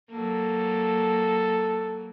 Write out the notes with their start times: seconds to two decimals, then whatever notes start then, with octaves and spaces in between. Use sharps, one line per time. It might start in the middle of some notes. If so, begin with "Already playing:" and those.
0.11 F#3 A#3 A4